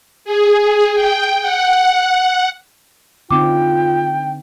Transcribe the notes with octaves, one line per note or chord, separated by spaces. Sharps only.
G#4
G5
F#5
D3 C4 D#4 F4 G5 D6